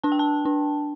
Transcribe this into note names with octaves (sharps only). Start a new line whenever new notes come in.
D4 A5
G5
A5
D4